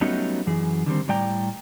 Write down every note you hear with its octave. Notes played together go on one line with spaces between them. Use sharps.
F#3 G3 A3 B3 C#4 D#4
F#2 E3 G#4
D3 D#3 G3 C4
A2 G3 D5 G5 A#5